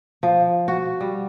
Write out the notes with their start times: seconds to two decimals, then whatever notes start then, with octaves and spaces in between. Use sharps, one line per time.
0.23 F3
0.68 F#4
1.01 G3